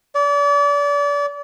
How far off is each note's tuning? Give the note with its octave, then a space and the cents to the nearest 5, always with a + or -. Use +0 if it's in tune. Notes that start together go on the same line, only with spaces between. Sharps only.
D5 -35